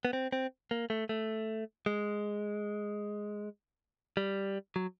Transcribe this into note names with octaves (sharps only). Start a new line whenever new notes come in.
B3
C4
C4
A#3
A3
A3
G#3
G3
F#3